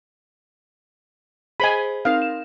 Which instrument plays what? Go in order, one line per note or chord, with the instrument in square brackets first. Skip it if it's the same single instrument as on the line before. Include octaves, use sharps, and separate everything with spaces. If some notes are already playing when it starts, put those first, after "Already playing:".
[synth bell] G#4 C5 D#5 [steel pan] G#5 B5
[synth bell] C4 D#4 A#4 [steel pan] F5
[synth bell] E7